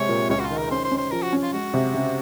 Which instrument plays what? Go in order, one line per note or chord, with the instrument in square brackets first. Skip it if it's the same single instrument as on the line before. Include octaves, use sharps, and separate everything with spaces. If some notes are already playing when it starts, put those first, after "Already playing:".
Already playing: [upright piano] C3 G#3 [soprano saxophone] C#5
[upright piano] A#2
[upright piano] C#2 [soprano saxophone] C#5
[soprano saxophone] F#4
F4
[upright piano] D#3
[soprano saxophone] A#4
[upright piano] C#4 [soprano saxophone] C5
[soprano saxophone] C5
[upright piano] C#4
[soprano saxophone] C5
[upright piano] F3 [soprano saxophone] A#4
[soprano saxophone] F#4
[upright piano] C#4
[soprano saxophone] F4
[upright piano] G#3 [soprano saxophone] F#4
[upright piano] C3
C#3